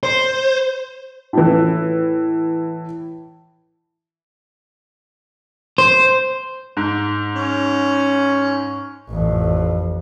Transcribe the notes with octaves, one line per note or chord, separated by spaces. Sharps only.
C5
A2 E3
C5
G#2
C#4
A1 F2